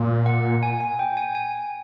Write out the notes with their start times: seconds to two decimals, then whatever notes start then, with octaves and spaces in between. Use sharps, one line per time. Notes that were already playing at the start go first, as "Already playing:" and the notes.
Already playing: A#2
0.26 F#5
0.63 G#5
0.80 G#5
0.99 G5
1.17 G#5
1.35 G#5